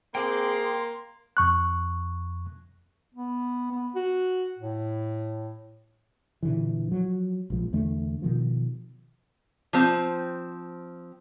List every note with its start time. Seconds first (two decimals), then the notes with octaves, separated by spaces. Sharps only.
0.15 A#3 C4 G#4 G5 C6 D6
1.37 F2 C#6 F#6
3.14 B3
3.71 B3
3.95 F#4
4.59 A2
6.43 A#2 D3 E3
6.88 F3 F#3
7.50 A#1 G#2 F3
7.73 E2 D3 A3
8.22 B2 D#3 F3
9.73 F3 C4